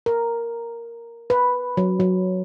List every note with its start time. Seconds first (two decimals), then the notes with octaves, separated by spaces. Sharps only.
0.06 A#4
1.30 B4
1.77 F#3
2.00 F#3